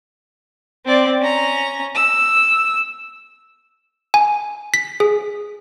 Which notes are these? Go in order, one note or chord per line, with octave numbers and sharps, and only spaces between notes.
C4 D5
C#4 A#5
E6
G#5
B6
G#4